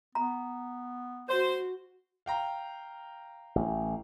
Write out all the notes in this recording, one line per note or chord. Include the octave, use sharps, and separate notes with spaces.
B3 A#5
F#4 C5
F5 G5 A#5
A1